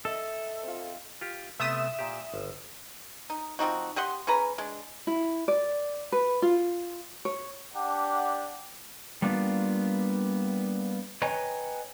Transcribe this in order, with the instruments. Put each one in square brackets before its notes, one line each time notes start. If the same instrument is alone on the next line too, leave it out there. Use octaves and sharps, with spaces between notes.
[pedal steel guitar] A4 [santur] D#5 E5
[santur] C4 F4
[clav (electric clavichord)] F4 G4
[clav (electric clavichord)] C3 A3 B3 [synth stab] E5 D#6 E7
[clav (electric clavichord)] A#2 G4
G1
[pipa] D#4
F3 C4 D#4 F#4
G4 D#5 F#5 C6
C#4 G#4 B4 A#5
G#3 D4
[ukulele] E4
D5
B4
F4
C#5
[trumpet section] D4 G4 F#5
[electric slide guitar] G3 A#3 B3 D4 F4
B4 C#5 D#5 G5 G#5 A#5